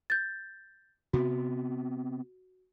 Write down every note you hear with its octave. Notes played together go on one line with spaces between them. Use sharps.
G6 A6
C3 B3 F#4